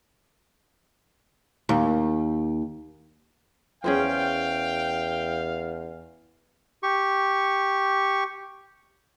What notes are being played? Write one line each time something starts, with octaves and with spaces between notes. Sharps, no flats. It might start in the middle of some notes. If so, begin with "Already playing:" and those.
D#2
E2 C#4 G#4 C5 F5 G5
G4 C#6